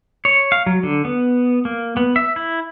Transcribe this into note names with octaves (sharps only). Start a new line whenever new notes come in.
C#5
F5
F#3
D3
B3
A#3
B3
E5
E4